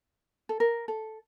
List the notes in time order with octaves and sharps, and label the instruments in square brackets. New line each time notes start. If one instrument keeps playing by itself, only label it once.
[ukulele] A4
A#4
A4